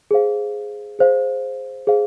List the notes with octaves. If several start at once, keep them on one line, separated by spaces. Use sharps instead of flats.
G#4 C5 F5
G#4 C5 F5
G#4 C5 F5